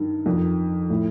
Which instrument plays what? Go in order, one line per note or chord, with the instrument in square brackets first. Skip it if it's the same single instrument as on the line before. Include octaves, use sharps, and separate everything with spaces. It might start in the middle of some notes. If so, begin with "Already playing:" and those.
Already playing: [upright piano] G2 D#3
F2 D#3
A2